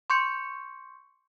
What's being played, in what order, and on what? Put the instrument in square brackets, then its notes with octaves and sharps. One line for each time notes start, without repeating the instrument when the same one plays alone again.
[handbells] C6 C#6 G6 C#7